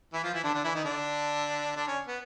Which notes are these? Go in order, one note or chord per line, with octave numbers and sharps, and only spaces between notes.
E3 E4
F3 F4
E3 E4
D3 D4
D3 D4
E3 E4
D#3 D#4
D3 D4
D3 D4
C#4
B3